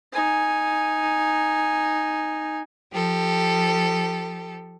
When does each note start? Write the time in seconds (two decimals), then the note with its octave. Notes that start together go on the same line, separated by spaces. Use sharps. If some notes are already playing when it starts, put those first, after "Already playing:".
0.13 D#4 G#5
2.91 F3 G4 A4